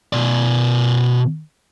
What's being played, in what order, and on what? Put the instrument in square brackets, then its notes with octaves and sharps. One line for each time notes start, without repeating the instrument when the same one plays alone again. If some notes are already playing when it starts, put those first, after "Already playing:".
[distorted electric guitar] B2 D5